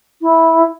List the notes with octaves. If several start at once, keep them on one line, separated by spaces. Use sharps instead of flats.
E4